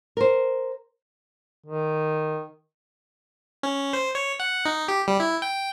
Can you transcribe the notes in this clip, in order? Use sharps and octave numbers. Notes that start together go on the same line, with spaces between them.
A#4 C5
D#3
C#4
C5
C#5
F#5
D#4
G4
G3
E4
G5